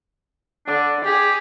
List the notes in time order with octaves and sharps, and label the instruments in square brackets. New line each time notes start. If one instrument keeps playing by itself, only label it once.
[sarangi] D3 [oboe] D4
[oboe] G4 [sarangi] G#4